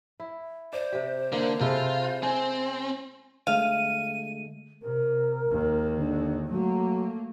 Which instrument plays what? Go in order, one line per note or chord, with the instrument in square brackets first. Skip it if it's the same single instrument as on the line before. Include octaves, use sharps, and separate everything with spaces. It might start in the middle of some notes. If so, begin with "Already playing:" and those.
[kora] E4
[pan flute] C5 [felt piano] D5
[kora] C3 G4
[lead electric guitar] D3 [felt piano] A#3
[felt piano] C3 [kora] G#3 E4 A4 [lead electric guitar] F4
[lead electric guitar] C4 [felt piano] G#5
[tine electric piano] D3 G#3 A3 [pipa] F5 [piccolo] D#7
[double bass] C3 [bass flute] A#4
[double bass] G#1 D#2
[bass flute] D3
[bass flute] F#3 [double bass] A3 A#3